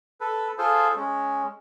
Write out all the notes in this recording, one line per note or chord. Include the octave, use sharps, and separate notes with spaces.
A4 B4
F4 G#4 A4 C5
G#3 C#4